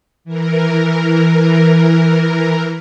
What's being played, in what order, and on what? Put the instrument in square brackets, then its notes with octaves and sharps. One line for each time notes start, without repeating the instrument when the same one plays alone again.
[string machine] E3 A#4